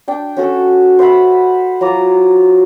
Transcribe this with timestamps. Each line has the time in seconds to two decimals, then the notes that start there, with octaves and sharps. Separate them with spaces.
0.08 D4 G5
0.37 C#4 F#4 A4
0.99 C5 E5 F#5 B5
1.81 F#3 F4 A#5 D6